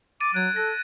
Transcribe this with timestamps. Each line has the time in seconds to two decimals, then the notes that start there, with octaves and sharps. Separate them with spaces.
0.21 D6 A6 D7 D#7
0.34 F#3 F#6 G#6 D7
0.56 A4 A#6